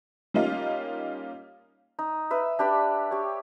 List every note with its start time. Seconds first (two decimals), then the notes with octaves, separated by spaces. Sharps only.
0.34 G3 A#3 C#4 D#4 F4
1.99 D#4
2.31 B4 E5
2.59 D4 G4 B4 B5
3.11 G4 C#5